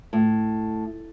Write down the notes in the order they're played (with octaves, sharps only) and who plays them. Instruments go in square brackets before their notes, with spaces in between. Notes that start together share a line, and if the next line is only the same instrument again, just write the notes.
[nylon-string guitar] A2